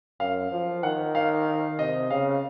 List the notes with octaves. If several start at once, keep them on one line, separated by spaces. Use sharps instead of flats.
F#2 F5
F3
D#3 F#5
F5
C3 D#5
C#3 F5